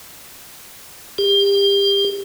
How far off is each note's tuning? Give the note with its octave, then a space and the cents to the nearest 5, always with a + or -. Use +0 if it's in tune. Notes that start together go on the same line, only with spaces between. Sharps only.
G4 +30